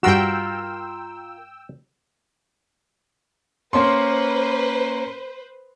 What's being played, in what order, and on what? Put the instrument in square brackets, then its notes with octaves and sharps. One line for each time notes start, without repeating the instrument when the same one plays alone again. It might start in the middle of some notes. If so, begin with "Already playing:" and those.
[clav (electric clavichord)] G2 F#4 [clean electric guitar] F4 A#4 [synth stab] G5 E6
[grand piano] A#3 C#4 C6 [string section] B4 C5